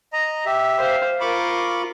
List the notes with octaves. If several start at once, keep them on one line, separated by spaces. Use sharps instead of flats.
D#5 A#5
G4 E5
C5 F5
F4 A#4 B5 C#6 D6